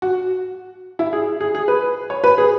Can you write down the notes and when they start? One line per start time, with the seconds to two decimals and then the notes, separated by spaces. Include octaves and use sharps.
0.02 F#4
0.99 E4
1.13 G#4
1.41 G#4
1.55 G#4
1.68 B4
2.10 C#5
2.24 B4
2.38 G#4